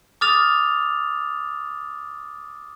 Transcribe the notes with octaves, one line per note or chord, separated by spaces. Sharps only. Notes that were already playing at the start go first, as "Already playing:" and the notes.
D6 D#6 F6 A6 F7